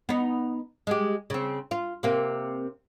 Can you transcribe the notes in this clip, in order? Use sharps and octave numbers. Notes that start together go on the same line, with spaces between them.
B3 D#4
G#3 G4
C#3 C4
F4
C3 A#3 C4